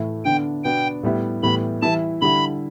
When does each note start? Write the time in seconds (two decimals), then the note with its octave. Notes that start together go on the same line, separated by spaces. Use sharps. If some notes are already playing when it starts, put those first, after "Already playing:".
Already playing: A2 E3 A3 E4
0.25 D3 B3 D4 G5
0.64 B2 B3 D4 G5
1.03 A2 G3 B3 E4
1.43 A2 E3 G3 B3 B5
1.82 E3 G3 E4 A5
2.21 D3 G3 E4 B5